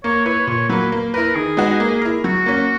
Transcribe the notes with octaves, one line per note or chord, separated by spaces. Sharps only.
A#3 C#5
E4 B4 C#5
A#2 C#5
F#3 A#3 B4
A#3
E4 A#4 B4
D#3 G#4
G#3 B3 D#4 F#4
A#3
E4 A#4
F#3 F#4
A#3 C#4